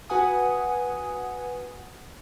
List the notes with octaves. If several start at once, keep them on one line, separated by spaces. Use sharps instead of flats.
F#4 B4 F#5 G#5 D#6